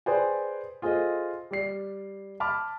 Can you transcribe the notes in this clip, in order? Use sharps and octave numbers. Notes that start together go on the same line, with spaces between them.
G#4 B4 C5 D5 G5 G#5
F4 G#4 A4 C5 D#5
G3 D5 C7
A5 B5 D6 F6